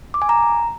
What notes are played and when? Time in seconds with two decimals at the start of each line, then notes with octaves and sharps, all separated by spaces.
0.14 D6
0.22 G#5
0.29 A#5